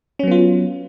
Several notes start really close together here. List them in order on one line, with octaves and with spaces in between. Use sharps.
C#4 F#3 B3 F4